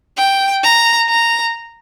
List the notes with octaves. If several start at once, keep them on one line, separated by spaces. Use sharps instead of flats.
G5
A#5
A#5